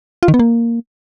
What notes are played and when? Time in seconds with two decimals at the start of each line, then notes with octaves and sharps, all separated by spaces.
0.23 F4
0.28 D#3
0.34 B3
0.39 A#3